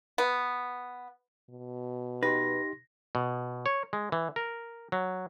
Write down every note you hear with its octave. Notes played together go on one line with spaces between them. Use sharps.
B3
B2
D#4 G4 B4 C6 A#6
B2
C#5
G#3
E3
A#4
F#3